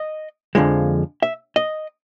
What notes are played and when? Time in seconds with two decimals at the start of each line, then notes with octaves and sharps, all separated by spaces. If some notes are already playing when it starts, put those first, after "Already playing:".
Already playing: D#5
0.55 F2 D3 F3 G#3
1.22 E5
1.56 D#5